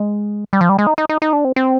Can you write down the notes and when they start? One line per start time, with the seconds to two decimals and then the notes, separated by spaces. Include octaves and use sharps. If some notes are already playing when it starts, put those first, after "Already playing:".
Already playing: G#3
0.53 G3
0.61 F3
0.69 G3
0.78 G#3
0.87 D#4
0.98 D#4
1.09 D#4
1.22 D#4
1.33 D4
1.45 C4
1.56 C4